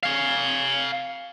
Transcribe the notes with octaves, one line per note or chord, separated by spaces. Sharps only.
F5 G#5